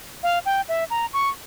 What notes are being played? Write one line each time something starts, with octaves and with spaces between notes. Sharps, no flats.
F5
G5
E5
A#5
C#6